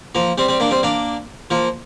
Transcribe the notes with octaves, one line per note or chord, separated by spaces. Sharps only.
F3 A#3
G3 C4
G3 C4
A#3 D4
G3 C4
A#3 D4
F3 A#3